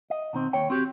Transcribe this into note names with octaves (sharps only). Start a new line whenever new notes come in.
D#5
B2 D#3 C4
D#2 C#5 G5
C4 F#4 G4